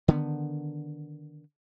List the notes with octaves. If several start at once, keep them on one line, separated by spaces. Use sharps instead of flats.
D3 D#3 B3